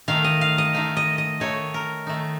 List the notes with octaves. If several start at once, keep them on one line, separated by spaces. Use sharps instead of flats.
D#3 A3 D#4 F5
D#5
F5
D#5
D#3 A3 D#4 F5
D#5
D#5
D#3 A3 D#4 C#5
A#4
D#3 A3 D#4